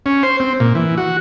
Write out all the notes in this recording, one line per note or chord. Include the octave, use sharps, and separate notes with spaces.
C#4
C5
C4
A#2
E3
F#4